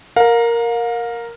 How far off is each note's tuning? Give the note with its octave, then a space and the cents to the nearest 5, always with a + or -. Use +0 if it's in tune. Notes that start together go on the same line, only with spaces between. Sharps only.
A#4 +0 F5 +35